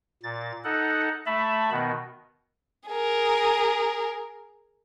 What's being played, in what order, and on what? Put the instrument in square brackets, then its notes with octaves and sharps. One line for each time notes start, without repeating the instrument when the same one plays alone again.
[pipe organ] A#2 A6
D#4 A4 F#5
A3 E5 A5 B5
B2 D#3 B3
[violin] G#4 A#4